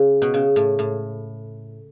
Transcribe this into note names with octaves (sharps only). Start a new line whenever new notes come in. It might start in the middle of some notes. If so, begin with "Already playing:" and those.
Already playing: C#3
B2
C#3
A2
A2